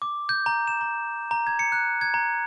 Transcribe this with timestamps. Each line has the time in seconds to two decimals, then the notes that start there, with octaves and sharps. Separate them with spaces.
0.02 D6
0.29 G6
0.46 A#5
0.67 E7
0.81 A#5
1.31 A#5
1.47 G#6
1.59 C#7
1.72 F#6
2.01 G#6
2.14 A#5